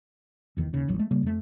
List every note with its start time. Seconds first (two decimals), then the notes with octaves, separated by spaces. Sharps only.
0.57 F1 E2 D#3
0.73 D#2 C#3
0.88 D#1 A1 F#3
0.99 G#3 A3
1.11 C#3 G3 A#3
1.23 F2 A3